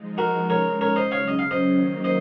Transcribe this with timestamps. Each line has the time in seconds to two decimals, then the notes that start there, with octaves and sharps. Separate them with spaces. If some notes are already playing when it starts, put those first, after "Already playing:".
Already playing: F3 G#3 D#4
0.18 F#4 A#4
0.50 C#3 G#3 D#4 A#4 C#5
0.81 A#4 C#5
0.96 C5 D#5
1.11 C#3 F#3 C#4 C#5 F5
1.28 D#5
1.39 F5
1.51 C5 D#5
1.74 D#3 F#3 A#3 D#4
2.04 C5 D#5